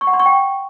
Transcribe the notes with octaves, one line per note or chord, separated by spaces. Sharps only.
C#6
F#5
C6
C#6
G5